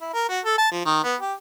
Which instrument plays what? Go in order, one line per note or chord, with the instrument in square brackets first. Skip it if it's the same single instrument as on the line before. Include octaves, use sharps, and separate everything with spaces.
[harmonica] E4
A#4
F#4
A4
A5
F3
D#3
B3
G4